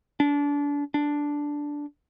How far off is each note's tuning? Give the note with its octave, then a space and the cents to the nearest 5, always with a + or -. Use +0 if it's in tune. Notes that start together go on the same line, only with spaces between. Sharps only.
D4 -30
D4 -5